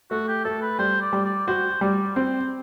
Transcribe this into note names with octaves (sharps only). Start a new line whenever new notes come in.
A3 F#4
G4
A3 A4
B4
G3 C5
D5
G3
D5
F#4 C5
G3 D5
C4 C5